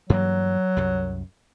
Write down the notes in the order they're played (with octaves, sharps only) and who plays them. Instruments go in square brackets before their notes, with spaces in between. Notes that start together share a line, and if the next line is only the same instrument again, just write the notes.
[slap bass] G2 E3 A#3 [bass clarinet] F#3
[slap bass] C2 F#2